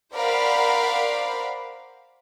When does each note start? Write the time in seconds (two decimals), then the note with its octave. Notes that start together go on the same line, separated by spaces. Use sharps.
0.15 A#4 C5 D5 F5 F#5 B5